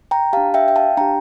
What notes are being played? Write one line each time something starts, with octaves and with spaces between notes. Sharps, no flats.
G5 A#5
D4 G4 F5 A5
E5 G5
G5
F5 A5
D4 G4 G5 A#5